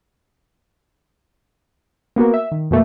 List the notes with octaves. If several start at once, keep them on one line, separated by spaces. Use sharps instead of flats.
A#3 B3 F#4 A#4
E5
D#3
F2 B2 A3 A#3